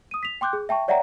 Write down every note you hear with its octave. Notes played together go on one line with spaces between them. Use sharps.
D#6 D#7
B6 F7
G5 C6 D6 F#6 G6
G#4
E5 G5 A5 C#6
C#5 D5 E5 F#5 G5 A#5